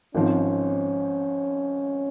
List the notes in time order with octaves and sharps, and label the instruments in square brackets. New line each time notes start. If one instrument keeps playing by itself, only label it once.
[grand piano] G#1 G#2 F3 C4 [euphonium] C#4